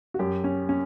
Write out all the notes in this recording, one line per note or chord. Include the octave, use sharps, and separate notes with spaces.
F#4
F#2 G4
C#4
C#4